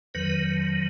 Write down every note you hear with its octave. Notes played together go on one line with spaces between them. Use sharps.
F2 D#3 F#3 B4